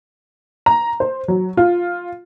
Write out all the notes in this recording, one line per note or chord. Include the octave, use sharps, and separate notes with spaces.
A#5
C5
F#3
F4